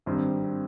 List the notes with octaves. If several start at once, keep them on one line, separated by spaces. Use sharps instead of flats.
G#1 G2 G3 C4